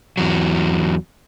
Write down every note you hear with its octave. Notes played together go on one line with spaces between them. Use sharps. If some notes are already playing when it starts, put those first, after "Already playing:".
E2 F#3